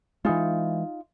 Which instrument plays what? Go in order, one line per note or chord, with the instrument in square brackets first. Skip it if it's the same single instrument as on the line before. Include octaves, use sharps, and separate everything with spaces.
[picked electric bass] E3 G#3 [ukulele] D#4 F4